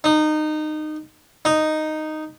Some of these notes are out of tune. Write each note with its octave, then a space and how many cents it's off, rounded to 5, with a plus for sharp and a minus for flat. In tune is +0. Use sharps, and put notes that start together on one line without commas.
D#4 -20
D#4 -5